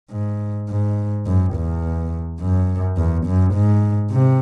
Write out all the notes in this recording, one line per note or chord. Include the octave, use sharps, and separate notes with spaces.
G#2
G#2
F#2
E2
F#2
E2
F#2
G#2
C3